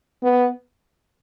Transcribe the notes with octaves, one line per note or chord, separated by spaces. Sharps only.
B3